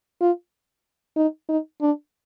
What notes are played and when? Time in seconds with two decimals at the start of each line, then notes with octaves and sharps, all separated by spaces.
0.21 F4
1.17 D#4
1.49 D#4
1.81 D4